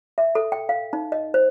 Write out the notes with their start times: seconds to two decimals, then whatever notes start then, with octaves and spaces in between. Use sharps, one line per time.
0.18 E5
0.35 A4
0.52 G5
0.69 F5
0.93 D#4
1.12 D#5
1.34 C5